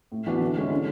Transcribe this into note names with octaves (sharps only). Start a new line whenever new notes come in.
A2
E3 B3 D4 F#4
D3
G#3 C#4 E4
D3